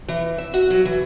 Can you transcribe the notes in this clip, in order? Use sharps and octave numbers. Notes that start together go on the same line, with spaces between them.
E3
E5
F#4
F#3
E3